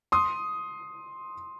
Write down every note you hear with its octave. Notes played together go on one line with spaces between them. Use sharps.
C6 D#6